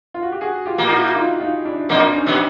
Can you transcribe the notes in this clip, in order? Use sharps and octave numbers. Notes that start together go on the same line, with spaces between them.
F4
F#4
G4
F#4 G#4
F4 G4
A#2 A#3
E4 F#4
D#4 F4
D#4 F4
D4 E4
A#2 A#3 C4 D4
C#4 D#4
B2 B3